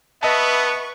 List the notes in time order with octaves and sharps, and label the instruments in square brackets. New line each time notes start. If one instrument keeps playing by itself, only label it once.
[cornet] B3 [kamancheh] B4 C#6 [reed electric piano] D#5 A5 [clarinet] E5